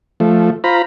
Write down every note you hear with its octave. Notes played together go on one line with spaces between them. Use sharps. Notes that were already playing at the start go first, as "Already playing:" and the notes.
F3 A3
F4 C5 A#5 B5